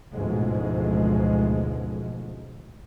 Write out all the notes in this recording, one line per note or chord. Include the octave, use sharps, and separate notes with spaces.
A1 D2 G#2 B2 F3 G#3